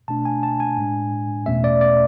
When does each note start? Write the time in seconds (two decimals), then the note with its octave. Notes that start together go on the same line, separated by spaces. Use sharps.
0.08 B2 A3 D4 A5
0.25 G#5
0.43 A5
0.60 G#5
0.78 A2 G#3 D4
1.46 E2 B2 A3 C#4 E5
1.64 D5
1.81 D5